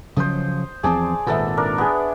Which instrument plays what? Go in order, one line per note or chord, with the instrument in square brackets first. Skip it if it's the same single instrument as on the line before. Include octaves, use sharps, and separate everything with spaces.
[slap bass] C#3 F3 F#3 [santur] C5 D#5
[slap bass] E2 F3 C4 [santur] G#4 D5 A5
[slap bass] G#1 A#2 [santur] B3 A4 E5
[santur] D4 A#4 D5
B3 G#4